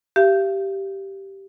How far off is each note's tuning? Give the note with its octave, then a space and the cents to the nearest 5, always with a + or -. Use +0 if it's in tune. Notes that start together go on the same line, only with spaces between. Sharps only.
G4 -10 F5 -45